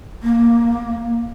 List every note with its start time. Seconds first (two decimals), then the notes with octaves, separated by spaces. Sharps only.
0.23 A#3